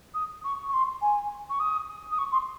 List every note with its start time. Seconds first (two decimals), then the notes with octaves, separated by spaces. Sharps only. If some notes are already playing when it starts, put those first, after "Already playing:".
0.14 D#6
0.44 C#6
0.68 C#6
0.73 C6
1.02 G#5
1.50 C#6
1.59 D#6
2.11 D#6
2.18 C#6
2.32 C6